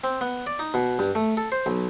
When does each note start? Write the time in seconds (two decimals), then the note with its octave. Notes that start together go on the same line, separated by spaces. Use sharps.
0.04 C4
0.21 B3
0.47 D5
0.59 D#4
0.74 B2
0.99 G2
1.15 A3
1.37 A4
1.52 C5
1.66 B1